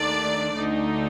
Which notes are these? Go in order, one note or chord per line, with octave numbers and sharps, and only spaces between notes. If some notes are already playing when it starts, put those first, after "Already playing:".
Already playing: D#2 D#3 A3 D4 D5
D2 D3 A3 D#4